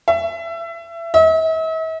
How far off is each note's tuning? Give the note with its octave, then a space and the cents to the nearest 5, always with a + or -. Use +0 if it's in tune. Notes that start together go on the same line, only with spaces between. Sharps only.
E5 +25
E5 -45